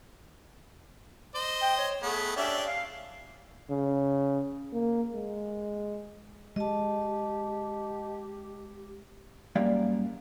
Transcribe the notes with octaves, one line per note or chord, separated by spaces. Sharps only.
C5 D#5
G5
C#5
A3 B3 G#4
C#4 D4 G4 E5
F5
C#3
A#3
G#3
G#3 G4 D#5 A5
F#2 G3 A#3 D5 F5